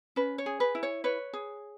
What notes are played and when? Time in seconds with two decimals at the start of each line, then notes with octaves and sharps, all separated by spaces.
0.16 C#4 B4
0.38 C#5
0.46 G#4
0.60 B4
0.75 E4
0.83 C#5
1.04 B4 C#5
1.33 G#4